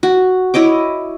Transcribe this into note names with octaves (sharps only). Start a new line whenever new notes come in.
F#4
E4 C#5 D#5 D6